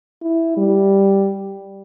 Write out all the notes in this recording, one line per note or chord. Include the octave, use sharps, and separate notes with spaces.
E4
G3